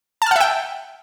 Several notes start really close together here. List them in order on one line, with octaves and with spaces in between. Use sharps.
A5 F6 F#5 E5 G5